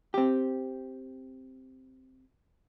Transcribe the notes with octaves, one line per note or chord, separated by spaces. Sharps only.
C4 G4